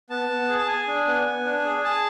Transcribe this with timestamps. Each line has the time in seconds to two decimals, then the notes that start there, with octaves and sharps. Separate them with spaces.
0.10 B3 A5
0.29 B3
0.49 G#4
0.58 A5
0.68 G#4 G#5
0.88 D4
1.07 B3
1.26 B3
1.45 D4
1.65 G#4
1.84 G#4 A5